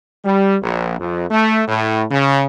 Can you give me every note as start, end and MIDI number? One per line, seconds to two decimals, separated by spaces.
0.24 0.56 55
0.62 0.95 34
0.99 1.25 41
1.30 1.62 57
1.67 2.04 45
2.10 2.46 49